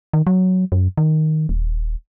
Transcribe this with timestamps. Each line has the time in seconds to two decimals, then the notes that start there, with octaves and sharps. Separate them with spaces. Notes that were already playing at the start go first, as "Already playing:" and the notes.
0.13 D#3
0.27 F#3
0.72 F#2
0.98 D#3
1.49 D#1